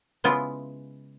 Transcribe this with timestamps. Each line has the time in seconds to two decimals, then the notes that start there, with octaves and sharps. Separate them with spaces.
0.24 C#3 G#3 B3 E4 F4